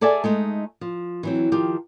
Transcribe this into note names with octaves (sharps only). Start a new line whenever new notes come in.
G#4 A4 D5 E5 G#5
G#3 A3 D#4
F3
E3 F#3 C4
D#3 F3 G4